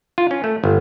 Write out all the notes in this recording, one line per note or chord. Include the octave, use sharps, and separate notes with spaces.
F4
C#4
A3
G1